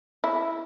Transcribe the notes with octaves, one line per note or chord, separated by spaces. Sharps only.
E4